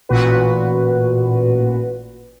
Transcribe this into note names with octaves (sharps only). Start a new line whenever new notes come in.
A1 A#2 F#4 B4